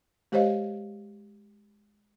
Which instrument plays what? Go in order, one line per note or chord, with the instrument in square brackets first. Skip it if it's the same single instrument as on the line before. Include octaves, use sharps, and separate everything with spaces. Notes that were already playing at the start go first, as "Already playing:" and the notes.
[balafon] G#3 G4 C5 C#5 D#5 F5